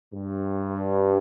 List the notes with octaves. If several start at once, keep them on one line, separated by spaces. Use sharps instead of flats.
G2